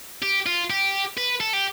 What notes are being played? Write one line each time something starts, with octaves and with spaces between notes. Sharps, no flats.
G4
F4
G4
B4
A4
G4